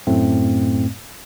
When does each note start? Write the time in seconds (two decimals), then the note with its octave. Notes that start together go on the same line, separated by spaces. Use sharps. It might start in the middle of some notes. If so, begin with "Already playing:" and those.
0.07 F#2 A2 A3 C4